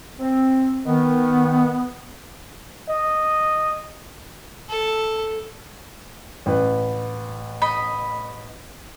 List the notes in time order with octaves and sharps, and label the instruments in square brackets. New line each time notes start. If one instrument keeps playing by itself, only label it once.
[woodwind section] C4
[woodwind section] D#3 [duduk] B3
[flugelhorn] D#5
[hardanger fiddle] A4
[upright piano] A1 B4
[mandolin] D#5 B5